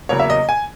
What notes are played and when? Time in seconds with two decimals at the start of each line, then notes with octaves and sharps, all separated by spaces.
0.09 E2 C#3 F#3 A#3 C#5
0.19 E5
0.30 D#5
0.49 G#5